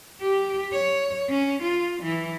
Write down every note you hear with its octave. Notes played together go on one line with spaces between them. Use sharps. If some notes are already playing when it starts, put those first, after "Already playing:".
G4
C#5
C#4
F4
E3